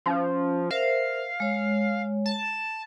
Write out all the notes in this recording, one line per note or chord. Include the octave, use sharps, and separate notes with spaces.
F3 C#4
A#4 C5 E5 F5
G#3 C#5
A5